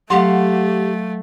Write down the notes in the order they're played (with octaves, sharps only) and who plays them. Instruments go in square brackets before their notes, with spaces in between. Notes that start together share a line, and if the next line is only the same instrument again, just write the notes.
[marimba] F#3 [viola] A3 [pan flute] G4 [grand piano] F5 F#5 C6